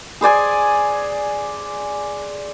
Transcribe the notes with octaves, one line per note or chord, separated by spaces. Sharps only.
G#4 C5 D5 G#5